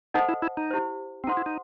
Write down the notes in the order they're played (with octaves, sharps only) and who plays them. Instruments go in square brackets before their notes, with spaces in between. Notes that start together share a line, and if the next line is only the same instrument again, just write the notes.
[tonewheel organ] D#4 [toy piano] A4 C5 D#5 F#5 A5
[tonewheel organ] E4
E4
D#4
[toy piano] E4 G4 C5
[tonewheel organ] C4
[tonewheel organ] D#4 [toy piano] A4 C5 F#5 C6
[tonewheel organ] E4
D#4